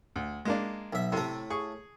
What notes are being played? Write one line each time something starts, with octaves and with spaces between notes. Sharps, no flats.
D2
G#3 A#3 D4
B1 E5
A2 C3 A3
G#4 C#6